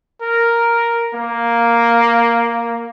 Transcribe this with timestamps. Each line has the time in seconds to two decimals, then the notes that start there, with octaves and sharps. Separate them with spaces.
0.22 A#4
1.14 A#3